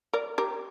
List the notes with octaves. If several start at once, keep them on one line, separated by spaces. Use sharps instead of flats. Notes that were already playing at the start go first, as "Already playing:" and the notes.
A#4 D5
G4 A#4